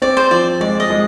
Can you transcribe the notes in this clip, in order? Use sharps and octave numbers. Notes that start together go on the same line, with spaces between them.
C4 D5
C5
F3 D5
G#3 D5
D#5
G#3